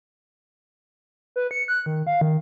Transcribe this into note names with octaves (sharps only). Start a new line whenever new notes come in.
B4
C#7
F#6
D#3
F5
D#3